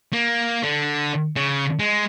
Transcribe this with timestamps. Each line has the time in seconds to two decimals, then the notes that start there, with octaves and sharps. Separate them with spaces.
0.13 A#3
0.63 D3
1.36 C#3
1.79 G#3